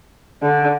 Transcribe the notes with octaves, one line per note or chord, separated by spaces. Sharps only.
D3